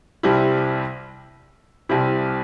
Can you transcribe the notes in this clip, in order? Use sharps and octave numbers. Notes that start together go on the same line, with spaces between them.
C2 C3 G3 C4 E4
C2 C3 G3 C4 E4